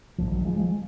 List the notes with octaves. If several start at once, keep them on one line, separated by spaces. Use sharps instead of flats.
A#1 G#2 F3
D#3 F#3
F3 G#3
F3 G#3